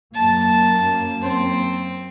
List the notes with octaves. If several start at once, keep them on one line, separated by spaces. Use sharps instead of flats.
F#2 A#3 A5
C4